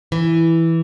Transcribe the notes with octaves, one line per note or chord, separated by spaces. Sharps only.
E3